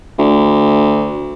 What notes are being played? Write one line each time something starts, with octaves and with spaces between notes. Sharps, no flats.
D2